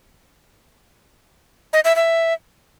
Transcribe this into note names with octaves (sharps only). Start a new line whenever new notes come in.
D#5
E5
E5